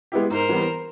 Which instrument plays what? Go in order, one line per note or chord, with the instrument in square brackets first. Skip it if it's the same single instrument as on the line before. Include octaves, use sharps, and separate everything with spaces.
[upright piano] G#3 B3 E4 G4
[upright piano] G#2 [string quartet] A#4 C5
[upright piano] E3 G3 B3